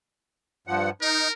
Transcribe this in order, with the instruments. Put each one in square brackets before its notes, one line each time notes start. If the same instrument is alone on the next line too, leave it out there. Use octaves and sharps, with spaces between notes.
[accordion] G2 F3 F#5
[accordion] D#4 [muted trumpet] A#4